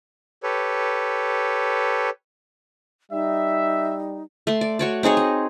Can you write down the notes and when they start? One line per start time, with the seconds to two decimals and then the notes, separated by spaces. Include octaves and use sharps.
0.43 G4 A4 B4 C#5
3.12 G3 D#4 E5
4.47 A3 C6
4.61 D5
4.79 F#4 C#5 D5
5.03 C4 D#4 G#4 C#5
5.17 D#5